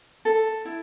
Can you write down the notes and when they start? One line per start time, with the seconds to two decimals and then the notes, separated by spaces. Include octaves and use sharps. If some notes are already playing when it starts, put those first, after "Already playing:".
0.25 A4
0.65 E4